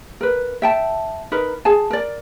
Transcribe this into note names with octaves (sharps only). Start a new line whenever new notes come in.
A#4 B4
E5 G5 A5
D#4 A#4 B4
G#4 G#5 A5
A#4 D5